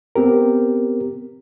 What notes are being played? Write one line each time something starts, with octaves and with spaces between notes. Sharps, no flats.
B3 C4 G4 A#4